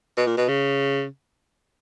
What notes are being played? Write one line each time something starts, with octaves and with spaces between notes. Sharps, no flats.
B2
A#2
B2
C#3